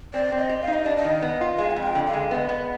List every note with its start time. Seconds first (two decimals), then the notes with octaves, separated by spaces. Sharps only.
0.14 C4 D5
0.32 C4
0.37 D#5
0.49 G4
0.62 F5
0.67 D#4
0.73 D#5
0.85 D4 D5
0.96 D#5
1.04 D#3
1.22 B3
1.41 F4
1.58 G#3 F5
1.71 G#5
1.76 F2
1.83 G5
1.95 D3
2.07 F5
2.13 G#3
2.31 B3 D#5 F5
2.49 B3